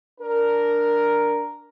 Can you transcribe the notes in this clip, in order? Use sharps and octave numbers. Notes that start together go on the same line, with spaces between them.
D4 A#4